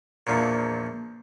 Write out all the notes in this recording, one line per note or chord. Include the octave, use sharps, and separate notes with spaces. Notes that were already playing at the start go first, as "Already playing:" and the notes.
A#1 E2 A#2 F3